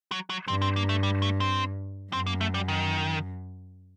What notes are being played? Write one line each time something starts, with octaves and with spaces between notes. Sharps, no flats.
F#3
F#3
G2 C4
C4
A#3
A3
G3
A3
C4
F#2 C4
A#3
A3
G3
D#3